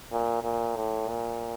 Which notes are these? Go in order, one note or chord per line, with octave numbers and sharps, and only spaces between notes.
A#2
A#2
A2
A#2